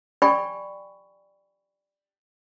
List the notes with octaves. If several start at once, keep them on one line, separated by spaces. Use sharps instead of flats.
D5 G5 G#5 B5 C#6